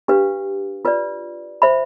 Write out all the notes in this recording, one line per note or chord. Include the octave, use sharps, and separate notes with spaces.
D4 G4 B4 F5
F4 B4 D5
C5 E5 B5